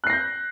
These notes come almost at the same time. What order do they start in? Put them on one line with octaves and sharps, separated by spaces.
F#6 C7 A#6 G6